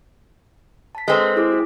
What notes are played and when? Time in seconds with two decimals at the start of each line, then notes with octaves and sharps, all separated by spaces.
0.95 A5 B6
1.08 G#3 C4 A4 B4 C6
1.36 E4 G#4 D6
1.52 F#4